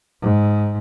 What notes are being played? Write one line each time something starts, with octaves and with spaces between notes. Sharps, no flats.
G#2